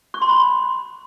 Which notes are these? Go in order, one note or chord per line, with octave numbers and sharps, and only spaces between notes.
C#6
C6
B5